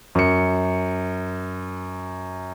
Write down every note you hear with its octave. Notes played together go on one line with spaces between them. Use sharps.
F#2 C#7